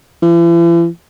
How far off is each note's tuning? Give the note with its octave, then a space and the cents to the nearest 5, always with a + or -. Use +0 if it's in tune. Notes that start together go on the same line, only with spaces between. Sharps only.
E3 +45